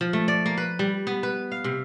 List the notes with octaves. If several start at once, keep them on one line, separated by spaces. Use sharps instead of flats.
F3
A3
D5
A#3
B4
G3
B3
B4
F5
C3